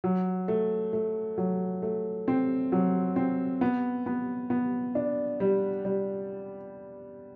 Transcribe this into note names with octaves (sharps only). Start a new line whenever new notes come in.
F#3
A3
A3
F#3
A3
C4
F#3
C4
B3
B3
B3
D4
G3
G3